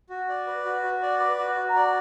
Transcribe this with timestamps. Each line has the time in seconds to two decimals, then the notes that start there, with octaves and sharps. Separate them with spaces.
0.10 F#4
0.29 D5
0.47 B4
0.65 F#4
0.83 F#4
1.02 D5
1.20 B4 D6
1.39 F#4
1.56 F#4
1.69 A#5
1.76 D5